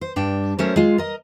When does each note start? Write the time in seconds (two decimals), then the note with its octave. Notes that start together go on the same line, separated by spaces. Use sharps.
0.01 C5
0.16 G2 D4 G5
0.59 F#3 A3 C#4 A#4 C5
0.76 G#3 F4
0.98 A#4 D#5